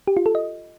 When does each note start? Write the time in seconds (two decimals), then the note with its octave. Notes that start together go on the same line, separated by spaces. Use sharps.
0.07 G4
0.17 F4
0.26 A4
0.35 D#5